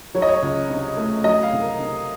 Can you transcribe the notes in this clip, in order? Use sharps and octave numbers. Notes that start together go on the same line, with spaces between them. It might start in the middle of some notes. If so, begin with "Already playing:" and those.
F#3 C#5
D#5
C#5
C#2
C3
A3
F#3 D#5
F5
C2
A#4
C3